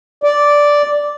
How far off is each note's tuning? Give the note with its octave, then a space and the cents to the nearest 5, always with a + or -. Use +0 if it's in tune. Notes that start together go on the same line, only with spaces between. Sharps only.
D5 -5